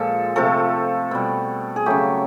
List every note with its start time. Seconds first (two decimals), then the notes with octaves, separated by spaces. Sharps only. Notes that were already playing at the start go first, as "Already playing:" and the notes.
Already playing: A#2 F3 G#3 A4
0.36 C3 F3 A3 A4
1.11 B2 G3
1.76 G#4
1.86 C#3 F#3 A3 G4